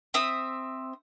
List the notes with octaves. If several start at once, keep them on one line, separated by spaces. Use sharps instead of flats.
C4 E5 D#6